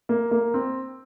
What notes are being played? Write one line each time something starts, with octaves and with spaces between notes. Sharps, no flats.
A#3
A#3
C4